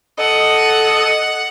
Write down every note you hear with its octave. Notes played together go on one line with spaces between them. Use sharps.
A4 D#5 F#5